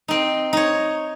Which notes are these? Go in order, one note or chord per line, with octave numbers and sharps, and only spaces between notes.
C4 D#4
D#4 C#5